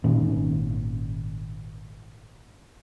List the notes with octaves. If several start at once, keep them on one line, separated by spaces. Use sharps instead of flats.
G#1 A#2 D#3 C#4